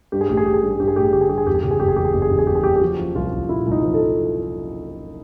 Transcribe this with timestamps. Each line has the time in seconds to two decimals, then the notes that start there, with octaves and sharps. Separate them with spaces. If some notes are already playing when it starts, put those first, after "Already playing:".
0.12 G2 G4
0.21 G#4
0.29 A1 G4
0.37 G#4
0.45 A1 G4
0.54 G#4
0.63 G2 G4
0.71 G#4
0.80 G2 G4
0.88 G#4
0.96 A1 G4
1.04 G#4
1.13 D3 G4
1.21 G#4
1.29 G2 G4
1.38 G#4
1.47 E2 G4
1.55 G#4
1.63 C#3 G4
1.71 G#4
1.80 F#1 G4
1.88 G#4
1.96 E2 G4
2.05 G#4
2.13 F#1 G4
2.22 G#4
2.30 E2 G4
2.39 G#4
2.47 E2 G4
2.55 G#4
2.64 F#1 G4
2.76 G4
2.81 F3 F#4
2.99 F3
3.15 C2 F4
3.33 C2
3.49 A#2 E4
3.66 C2
3.71 D#4
3.83 F3
3.94 A4
4.00 F3